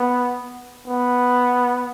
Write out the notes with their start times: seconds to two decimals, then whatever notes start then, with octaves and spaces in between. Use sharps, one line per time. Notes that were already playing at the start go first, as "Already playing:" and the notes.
Already playing: B3
0.86 B3